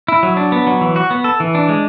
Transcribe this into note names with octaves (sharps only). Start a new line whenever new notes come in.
E4
F#3
D4
B3
F#3
E3
F#4
B3
A4
E3
D4
G#3